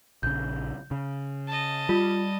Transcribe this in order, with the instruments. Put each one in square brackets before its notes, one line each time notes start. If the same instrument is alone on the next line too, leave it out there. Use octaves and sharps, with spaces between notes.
[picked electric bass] A#1 C#3 [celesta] G6
[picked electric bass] C#3
[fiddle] D#5 A5
[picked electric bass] G3 [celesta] F4